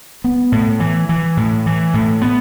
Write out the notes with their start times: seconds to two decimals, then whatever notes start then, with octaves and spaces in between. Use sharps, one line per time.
0.24 B3
0.52 A2
0.80 E3
1.09 E3
1.37 A2
1.66 E3
1.94 A2
2.22 B3